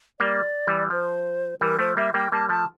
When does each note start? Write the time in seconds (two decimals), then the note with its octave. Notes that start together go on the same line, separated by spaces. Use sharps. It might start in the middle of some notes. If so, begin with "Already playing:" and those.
0.20 G3 A#3 D5
0.67 E3 G3
0.90 F3 C5
1.61 E3 G3 A#4
1.79 F3 A3 C5
1.97 G3 A#3 E5
2.14 G3 A#3 G5
2.32 G3 A#3 A5
2.49 F3 A3 A5